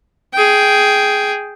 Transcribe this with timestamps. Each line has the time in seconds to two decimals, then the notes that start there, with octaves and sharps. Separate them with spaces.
0.34 G#4 G5